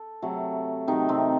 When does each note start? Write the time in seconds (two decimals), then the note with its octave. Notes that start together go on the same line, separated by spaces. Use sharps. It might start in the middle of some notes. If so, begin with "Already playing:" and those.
Already playing: A4
0.22 C3 F#3 A3
0.87 C3 D#3 F#3 A3 D#4
1.09 C3 C4